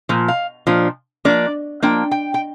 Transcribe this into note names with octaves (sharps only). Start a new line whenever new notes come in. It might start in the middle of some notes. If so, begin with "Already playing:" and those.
A#2 F3
F5
A#2 F3 D4
F3 A#3 D4 D5
F3 A#3 D4 G5
G5
G5